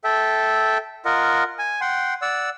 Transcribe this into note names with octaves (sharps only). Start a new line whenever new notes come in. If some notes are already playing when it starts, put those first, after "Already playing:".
A4 E5 G5
F4 A#4 D#5 F#5
G#5
F#5 G5 C6
D5 F#5 E6